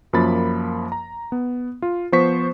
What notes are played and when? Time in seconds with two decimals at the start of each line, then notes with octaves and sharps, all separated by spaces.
0.13 F#2 F3 A#3 B5 A6
0.92 A#5
1.32 B3
1.82 F4
2.12 F3 B3 C5 C#6 B6